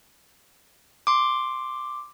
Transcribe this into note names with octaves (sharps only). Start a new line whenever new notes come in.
C6 D6